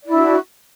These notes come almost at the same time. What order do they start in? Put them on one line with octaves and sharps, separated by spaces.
D5 E4 D4 F#4